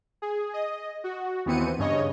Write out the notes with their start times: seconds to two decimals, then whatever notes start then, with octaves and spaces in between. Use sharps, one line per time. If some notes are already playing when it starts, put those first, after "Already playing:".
0.22 G#4
0.53 D#5
1.04 F#4
1.46 D#2 E3 B3 C4 C#7 D#7
1.78 G2 C#3 C#5 D#5